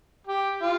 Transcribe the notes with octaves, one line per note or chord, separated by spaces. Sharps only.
G4
F4